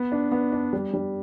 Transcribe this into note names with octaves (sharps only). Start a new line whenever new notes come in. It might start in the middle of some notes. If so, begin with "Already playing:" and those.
Already playing: B3
D4
B3
D4
G3
G3